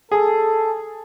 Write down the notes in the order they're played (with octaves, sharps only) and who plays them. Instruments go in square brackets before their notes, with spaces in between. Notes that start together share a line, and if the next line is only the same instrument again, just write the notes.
[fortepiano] G#4 [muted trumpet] A4